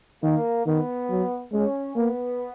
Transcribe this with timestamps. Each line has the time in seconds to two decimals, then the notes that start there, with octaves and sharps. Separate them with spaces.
0.23 D#3 A#3
0.66 D#3 B3
1.10 F#3
1.52 G#3 C#4
1.96 A#3 B3